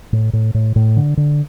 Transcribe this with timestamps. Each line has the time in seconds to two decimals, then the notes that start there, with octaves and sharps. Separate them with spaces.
0.13 A2
0.33 A2
0.54 A2
0.76 A2
0.97 D3
1.17 D3